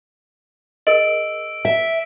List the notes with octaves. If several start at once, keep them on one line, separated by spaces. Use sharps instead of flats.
G#4 A#4 D#5 E6 D7 F#7
E5